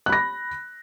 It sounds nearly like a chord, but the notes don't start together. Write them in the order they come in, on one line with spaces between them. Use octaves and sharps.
F#6 B5 A#6